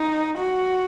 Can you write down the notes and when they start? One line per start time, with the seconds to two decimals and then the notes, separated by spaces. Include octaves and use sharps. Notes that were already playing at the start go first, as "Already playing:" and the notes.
Already playing: D#4
0.38 F#4